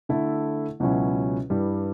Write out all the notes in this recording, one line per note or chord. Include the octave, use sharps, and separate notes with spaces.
D3 A3 E4 A4
C#2 B2 F#3 C#4 E4
G2 E3 G3